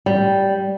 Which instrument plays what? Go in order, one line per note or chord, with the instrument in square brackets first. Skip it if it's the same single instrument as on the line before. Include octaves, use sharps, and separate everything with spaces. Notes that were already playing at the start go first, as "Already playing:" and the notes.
[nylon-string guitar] G3